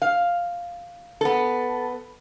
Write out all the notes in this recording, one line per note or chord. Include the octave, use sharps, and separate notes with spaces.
F5
B3 A4